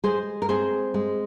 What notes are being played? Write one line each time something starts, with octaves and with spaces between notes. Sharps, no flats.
G#3 G#4 C5
A#4
C4 G#4 C5
G#3